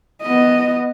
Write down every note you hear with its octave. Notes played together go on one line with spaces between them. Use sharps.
B3 D#5